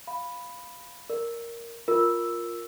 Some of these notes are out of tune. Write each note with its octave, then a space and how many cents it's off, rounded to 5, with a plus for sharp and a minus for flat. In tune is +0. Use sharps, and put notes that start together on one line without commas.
F5 +0 B5 +0
A#4 +0 D5 +10
F4 +5 A#4 +0 E6 +0